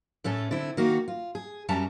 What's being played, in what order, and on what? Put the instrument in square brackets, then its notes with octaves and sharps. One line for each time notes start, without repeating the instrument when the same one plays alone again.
[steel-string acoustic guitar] A2 A3 C#4 A4
D3 C4 E4
D#3 A#3 F#4
F4
G#4
F#2 G3 C#4 E5 A5 A#5